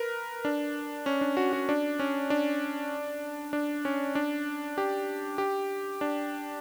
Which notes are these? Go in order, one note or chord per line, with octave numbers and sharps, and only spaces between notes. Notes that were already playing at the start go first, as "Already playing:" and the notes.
Already playing: A#4 B4
D4
C#4
D4
F#4
F#4
D4
C#4
D4
D4
C#4
D4
G4
G4
D4